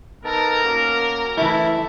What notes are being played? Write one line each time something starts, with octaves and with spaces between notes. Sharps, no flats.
B3 D#4 A4 A#4
A#3 C#4 F#4
E3 A3 E4 A4 E5